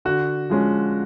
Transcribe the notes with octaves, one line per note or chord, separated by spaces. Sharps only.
D3 F#4
F3 G#3 C#4